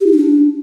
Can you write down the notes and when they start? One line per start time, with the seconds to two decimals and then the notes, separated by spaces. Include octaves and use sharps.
0.01 G4
0.06 E4
0.12 D#4
0.18 D4